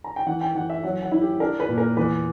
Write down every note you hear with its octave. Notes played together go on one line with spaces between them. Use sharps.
A#5
G5
E3 F#5
G5
E3 F#5
E5
F#3 F#5
F#5
E4
G4
D4 A#4
B4
A#2
A#4
E2 B4